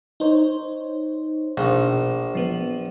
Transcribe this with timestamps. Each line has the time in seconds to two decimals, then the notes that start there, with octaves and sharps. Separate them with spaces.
0.20 D#4 C5 C#5
1.57 A#1 B2
2.35 F3 B3